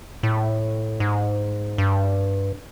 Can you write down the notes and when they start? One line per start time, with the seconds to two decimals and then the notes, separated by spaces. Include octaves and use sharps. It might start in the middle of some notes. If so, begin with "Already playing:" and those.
0.23 A2
1.00 G#2
1.78 G2